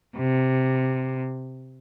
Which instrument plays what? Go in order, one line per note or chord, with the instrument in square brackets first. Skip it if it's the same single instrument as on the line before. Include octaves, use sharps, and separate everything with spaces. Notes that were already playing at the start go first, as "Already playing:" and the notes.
[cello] C3